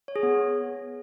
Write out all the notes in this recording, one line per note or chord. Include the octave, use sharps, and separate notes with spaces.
C#5
G#4
B3